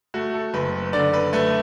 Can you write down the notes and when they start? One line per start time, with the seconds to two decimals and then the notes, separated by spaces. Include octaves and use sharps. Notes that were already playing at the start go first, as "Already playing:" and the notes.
0.14 A3 F#4
0.34 A4
0.54 F#1 B4
0.93 D3 D5
1.13 B4
1.33 A3 B4